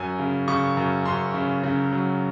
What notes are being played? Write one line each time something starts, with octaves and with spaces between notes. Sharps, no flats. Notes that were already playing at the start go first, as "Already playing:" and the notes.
Already playing: F#2 G#5
C#3
C#3 C#6
F#2
F#2 C6
C#3
C#3
F#3